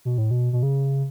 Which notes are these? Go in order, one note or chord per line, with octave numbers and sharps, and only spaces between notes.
B2
A2
B2
B2
C#3